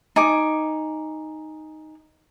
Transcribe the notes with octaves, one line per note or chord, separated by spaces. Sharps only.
D#4 G#5 D6